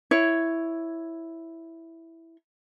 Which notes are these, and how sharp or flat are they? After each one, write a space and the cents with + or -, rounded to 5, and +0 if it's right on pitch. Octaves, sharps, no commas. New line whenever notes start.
E4 +0 C#5 +0